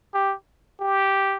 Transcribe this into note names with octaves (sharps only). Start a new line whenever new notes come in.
G4
G4